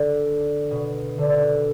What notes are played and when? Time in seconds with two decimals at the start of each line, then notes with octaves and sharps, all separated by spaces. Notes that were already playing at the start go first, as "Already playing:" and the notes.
Already playing: D3
0.71 B2
1.18 D3